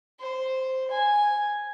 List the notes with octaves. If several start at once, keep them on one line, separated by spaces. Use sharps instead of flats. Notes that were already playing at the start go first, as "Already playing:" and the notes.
C5
G#5